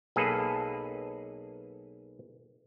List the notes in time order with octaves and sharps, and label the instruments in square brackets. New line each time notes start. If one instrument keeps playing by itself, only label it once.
[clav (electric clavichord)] B1 A#3 G#4 A4 B4